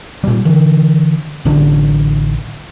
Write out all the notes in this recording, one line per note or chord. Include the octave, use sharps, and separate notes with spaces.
A#2 G3
D3 E3
A1 D3 F#3 D4